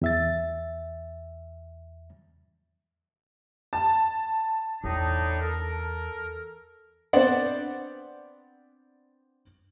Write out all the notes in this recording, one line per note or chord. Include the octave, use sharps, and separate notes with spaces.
E2 E5 A6
A5
E2 A2 D4 D#4
A4 A#4
B3 C4 D4 C5 D5 F#5